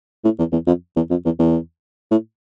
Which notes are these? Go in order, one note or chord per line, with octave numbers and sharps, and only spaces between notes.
A2
E2
E2
F2
E2
F2
E2
E2
A2